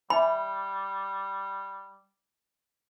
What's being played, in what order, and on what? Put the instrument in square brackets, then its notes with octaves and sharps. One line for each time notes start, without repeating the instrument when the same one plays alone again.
[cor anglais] G3 [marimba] E5 G#5 [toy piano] B5